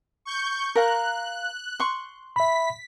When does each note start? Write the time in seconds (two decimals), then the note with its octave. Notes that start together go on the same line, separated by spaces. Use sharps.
0.25 C#6 G6
0.75 A#4 F5 A#5 F#6
1.80 C6 C#6
2.36 E5 B5 B6